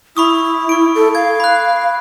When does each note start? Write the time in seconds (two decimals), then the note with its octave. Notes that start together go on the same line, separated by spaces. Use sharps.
0.17 E4 B5 C#6 D#6
0.69 C#6 D7
0.95 A4
1.15 F5 G#6
1.40 B5 F#6